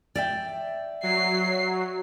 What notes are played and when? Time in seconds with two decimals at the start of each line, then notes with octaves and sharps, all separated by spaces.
0.15 D5 E5 G5
1.03 F#3 C7